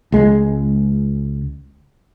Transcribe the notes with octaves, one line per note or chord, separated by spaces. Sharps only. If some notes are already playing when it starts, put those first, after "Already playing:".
C#2 G#3